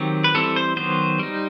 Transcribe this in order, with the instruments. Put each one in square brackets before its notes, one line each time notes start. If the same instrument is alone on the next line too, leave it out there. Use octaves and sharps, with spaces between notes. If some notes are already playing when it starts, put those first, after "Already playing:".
Already playing: [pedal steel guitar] D#3 F#3 C4 G4
B4
E3 G3 C4 A4
C5
D#3 F#3 B3 C5
G3 D#4